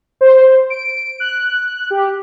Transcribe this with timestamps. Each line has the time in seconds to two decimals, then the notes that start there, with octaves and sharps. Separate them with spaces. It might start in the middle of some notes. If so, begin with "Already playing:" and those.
0.21 C5
0.70 D7
1.20 F#6
1.90 G4